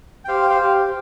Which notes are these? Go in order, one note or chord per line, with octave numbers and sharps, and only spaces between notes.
G5
G4 C5 F5
G5
C5 F5
G4